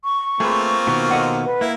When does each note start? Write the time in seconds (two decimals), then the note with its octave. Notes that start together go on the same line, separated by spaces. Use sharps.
0.04 C#6
0.40 A3 A#3 C4 F4 G#4 B4
0.87 B2 D#3 B3
1.11 A4 D#5 F#5
1.44 B4
1.61 A#3 E4